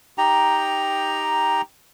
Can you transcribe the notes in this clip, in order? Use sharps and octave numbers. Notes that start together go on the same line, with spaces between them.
D#4 G4 G5 A#5